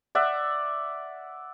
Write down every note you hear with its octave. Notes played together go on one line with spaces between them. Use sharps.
D5 E5 F#5